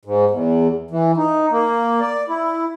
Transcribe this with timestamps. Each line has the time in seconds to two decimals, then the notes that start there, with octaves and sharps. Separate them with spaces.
0.05 G#2
0.31 E2
0.91 E3
1.17 D#4
1.51 A#3
2.01 D5
2.29 E4